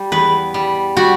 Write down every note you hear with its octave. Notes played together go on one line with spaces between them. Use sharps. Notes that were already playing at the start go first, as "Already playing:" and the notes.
Already playing: G3
E2 B4
G3
G3 F#4